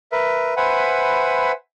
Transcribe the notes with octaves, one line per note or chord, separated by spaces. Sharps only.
A#4 B4 E5
B4 C5 E5 F#5 G#5 B5